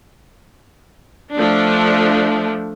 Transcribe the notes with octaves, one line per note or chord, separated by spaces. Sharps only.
F3 A3 D4